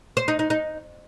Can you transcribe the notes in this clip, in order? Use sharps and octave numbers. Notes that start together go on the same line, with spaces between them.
C5
D#4
D#4
D#4